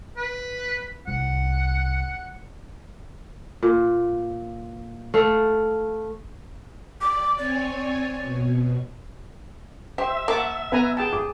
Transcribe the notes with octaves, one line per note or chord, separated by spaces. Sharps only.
B4
C2 F#5
A#2
A3 F5
D5 D6
C4 C#5 D5 G#5
B2
G4 C5 E5
A#3 F#5 A5 D6
B3 B4 G#5 A#5
G#4 G5 A5
G#4 D6